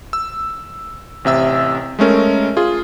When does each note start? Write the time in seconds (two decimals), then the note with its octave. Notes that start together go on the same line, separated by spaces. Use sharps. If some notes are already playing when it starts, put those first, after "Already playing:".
0.13 E6
1.25 A1 C3 E5 E6
1.99 G#3 A3 C#4 A#4
2.57 F4 G#4